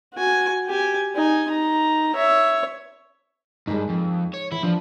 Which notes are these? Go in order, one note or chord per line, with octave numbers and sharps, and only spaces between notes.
F#4 G#5
G4 G#5
D#4 G#5
D#4 A#5
C#5 E5
G2 G#3 D#4
F2
C#5
E3 E4
F3 D4